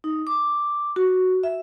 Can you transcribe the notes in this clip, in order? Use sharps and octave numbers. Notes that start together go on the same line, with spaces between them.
D#4
D6
F#4
E5